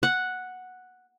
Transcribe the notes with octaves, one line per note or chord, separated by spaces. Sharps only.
F#5